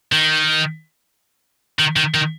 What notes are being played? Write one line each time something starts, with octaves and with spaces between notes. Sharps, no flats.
D#3
D#3
D#3
D#3